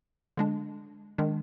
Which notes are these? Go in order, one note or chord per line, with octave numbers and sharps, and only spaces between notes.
D3 G#3 D4
D#3 G#3 D4